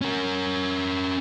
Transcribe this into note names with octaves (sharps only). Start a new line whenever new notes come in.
C#4 A#4